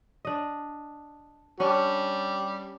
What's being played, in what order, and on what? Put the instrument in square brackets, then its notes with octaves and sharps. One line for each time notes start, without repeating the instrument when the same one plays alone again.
[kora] D4 D#5
[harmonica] G3 [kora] C#4 D4